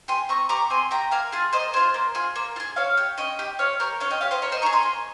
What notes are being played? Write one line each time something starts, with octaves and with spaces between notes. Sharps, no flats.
G4 G#5 C6
C4 A#5 C#6
G4 A#5 C#6
C4 G#5 C6
G4 G5 A#5
A#3 F5 G#5
F4 G#4
A#3 C5 D#5
F4 G#4 C5
A#3
F4 G#4
A#3
F4
G#4
C#4 C#5 F5
G4
C#4 D#5 G5
G4
C#4 C#5 F5
G4 A#4 C#5
C#4 C#5 F5
D#5 G5
G4 C#5 F5
C5 D#5
A#3 A#4 C#5
C5 D#5
D#4 G#4 A#5 C#6
G#5 C6
A#3